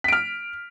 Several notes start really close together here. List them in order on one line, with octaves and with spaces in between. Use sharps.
B6 D7 F6